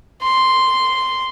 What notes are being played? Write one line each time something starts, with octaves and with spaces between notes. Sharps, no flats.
C6